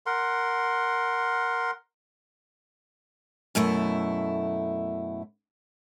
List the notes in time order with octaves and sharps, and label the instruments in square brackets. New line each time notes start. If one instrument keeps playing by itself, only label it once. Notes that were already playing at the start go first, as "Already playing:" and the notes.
[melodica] A#4 F#5 C6
[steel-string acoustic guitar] F#2 B2 A3 E4